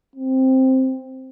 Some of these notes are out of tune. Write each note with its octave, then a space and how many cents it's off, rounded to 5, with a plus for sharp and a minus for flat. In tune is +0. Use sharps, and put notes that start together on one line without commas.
C4 +5